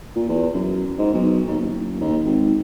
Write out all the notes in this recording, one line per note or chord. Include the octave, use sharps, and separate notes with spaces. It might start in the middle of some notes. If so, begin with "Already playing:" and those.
A#2
E2
F#2
G#2
B1
D#2
F#1
D#2
G#1